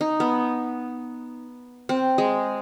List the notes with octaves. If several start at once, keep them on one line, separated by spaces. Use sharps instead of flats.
D#4
B3
C4
G#3